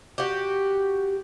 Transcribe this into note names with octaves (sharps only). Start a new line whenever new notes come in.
F#4 G4